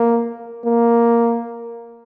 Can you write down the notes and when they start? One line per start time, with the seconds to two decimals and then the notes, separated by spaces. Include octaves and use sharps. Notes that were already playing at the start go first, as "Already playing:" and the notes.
Already playing: A#3
0.65 A#3